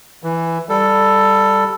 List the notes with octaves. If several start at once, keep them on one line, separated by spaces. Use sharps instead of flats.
E3
G3 A4